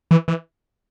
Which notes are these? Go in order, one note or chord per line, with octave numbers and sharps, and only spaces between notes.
E3
E3